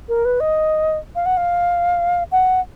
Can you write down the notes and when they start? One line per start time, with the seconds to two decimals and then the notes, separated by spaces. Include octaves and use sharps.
0.09 A#4
0.25 B4
0.40 D#5
1.15 F5
1.26 F#5
1.37 F5
2.32 F#5